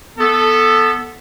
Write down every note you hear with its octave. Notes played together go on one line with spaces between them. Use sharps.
B3 A4